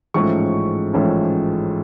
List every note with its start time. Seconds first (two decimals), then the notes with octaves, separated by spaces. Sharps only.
0.14 A1 G#2 F3 A3 C#4 C#6
0.93 A1 G#2 F3 A3 C#4